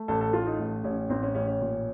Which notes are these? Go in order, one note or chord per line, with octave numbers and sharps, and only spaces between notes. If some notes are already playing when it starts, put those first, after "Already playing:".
Already playing: A3
A1 A4
A4
A3 F4
D#4
A1
A1 C#4
A1 C4
C#4
A1 C#4
C#4
A#2